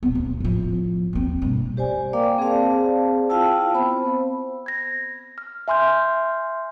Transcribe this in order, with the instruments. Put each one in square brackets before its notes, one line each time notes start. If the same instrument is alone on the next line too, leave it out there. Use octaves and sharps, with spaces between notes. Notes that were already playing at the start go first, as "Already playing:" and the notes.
[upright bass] D#1 B3
D2
A2 F3
D#2 C4
G2 B2
[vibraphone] G4 C5 D5 G#5
A#3 A#4 D5 F5 G5 D6
C4 G#4 C5 D5 F5 A5
E4 F4 F5 G5 A5 E6
B3 C4 C5 B5
[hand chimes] G#6 A#6
F6
E5 G#5 C6 F6 G6